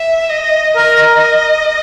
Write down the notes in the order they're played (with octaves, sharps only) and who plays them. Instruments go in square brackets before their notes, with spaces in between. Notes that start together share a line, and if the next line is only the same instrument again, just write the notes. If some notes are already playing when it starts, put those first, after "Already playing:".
Already playing: [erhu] E5
D#5
[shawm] A#4 [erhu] D#5